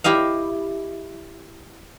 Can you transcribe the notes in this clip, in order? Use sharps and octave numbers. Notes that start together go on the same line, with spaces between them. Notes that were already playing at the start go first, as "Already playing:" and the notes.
E4 G4 D#5 F5